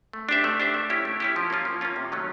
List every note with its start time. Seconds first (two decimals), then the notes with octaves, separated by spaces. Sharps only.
0.13 A3
0.29 D4 G4 C5 E5
0.44 A3
0.60 D4 G4 C5 E5
0.74 A3
0.90 C#4 E4 G4
1.05 A3
1.20 C#4 E4 G4
1.36 F3
1.50 A#3 C#4 F4
1.65 F3
1.81 A#3 C#4 F4
1.96 C3
2.12 D#3 F#3 A3 C#4